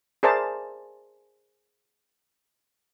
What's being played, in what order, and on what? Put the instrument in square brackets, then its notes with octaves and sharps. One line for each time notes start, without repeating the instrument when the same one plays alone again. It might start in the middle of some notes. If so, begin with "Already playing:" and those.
[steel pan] G#4 A#4 C5 D5 E5 A5